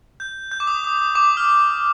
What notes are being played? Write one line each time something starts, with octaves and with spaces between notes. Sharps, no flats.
G6
G6
D6
D#6
D#6
D#6
D6
D#6
F6